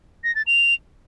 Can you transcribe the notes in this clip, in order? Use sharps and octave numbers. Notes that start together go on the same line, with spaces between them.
A#6
A6
F7